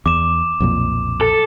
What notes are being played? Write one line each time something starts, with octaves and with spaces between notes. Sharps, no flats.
E2 D6 E7
B1 F2 A#2
A4